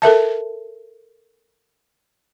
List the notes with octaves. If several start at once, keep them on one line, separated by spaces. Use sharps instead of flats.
A4 A#4 E5 A5